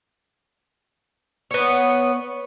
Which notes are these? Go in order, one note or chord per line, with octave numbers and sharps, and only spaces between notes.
B3 C#5